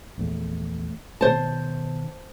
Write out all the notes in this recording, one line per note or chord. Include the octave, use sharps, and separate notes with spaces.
A#1 E2 A3
B2 D#3 C5 A5